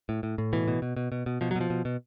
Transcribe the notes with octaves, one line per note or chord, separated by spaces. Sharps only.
A2
A2
A2
B2 E3
B2
B2
B2
B2
B2
B2 F3
F#3
B2
F3
B2
B2